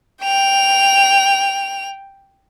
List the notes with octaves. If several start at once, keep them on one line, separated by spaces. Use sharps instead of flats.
G5 F7